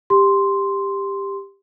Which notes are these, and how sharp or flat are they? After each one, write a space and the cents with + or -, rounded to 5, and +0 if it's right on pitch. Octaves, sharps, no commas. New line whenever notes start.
G4 +15 C6 +0